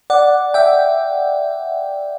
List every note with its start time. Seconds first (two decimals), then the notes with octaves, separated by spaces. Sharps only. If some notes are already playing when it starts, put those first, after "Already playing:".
0.10 D5 F#5
0.54 E5 G5